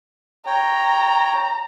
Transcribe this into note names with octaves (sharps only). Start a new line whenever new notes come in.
C#5 G5 A#5